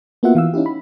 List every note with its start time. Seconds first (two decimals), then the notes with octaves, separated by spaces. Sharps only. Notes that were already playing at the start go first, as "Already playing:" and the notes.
0.23 A#3 B3 F4 F#4 E5 F#5
0.35 E3 F5 E6
0.54 C#4 D#4 E4 G4
0.66 B5